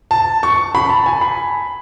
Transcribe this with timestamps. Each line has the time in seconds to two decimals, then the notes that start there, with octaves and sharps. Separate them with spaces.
0.11 A5
0.43 C#6
0.75 B5
0.89 A5
1.06 G#5
1.21 B5